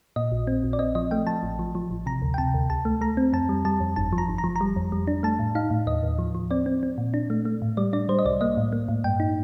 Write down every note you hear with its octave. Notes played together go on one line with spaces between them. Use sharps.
A#2 D#5
A#1
C4
A#1
D5
C4 D#5
F3 D#5
A3 G5
F3 A5
A1
F3
F3
A1
C3 A#5
D2
G5
C3 A5
D2
C2 A5
A3
A3 A#5
C4
F2 A5
G3
G3 A5
F2
G1 A5
F3
A#5
G1
A#5
F3
A#5
G3
F2
G3
D4
A3 A5
A2
D#4 F5
A2
D#2 D#5
D#2
F3
F3
C4 D5
C4
C4
A#2
D4
A3
A3
A2
G3 D5
D4 D5
G3 C5
D#5
C2 D5
A#3 D#5
A2
A#3
A2
G2 G5
D#4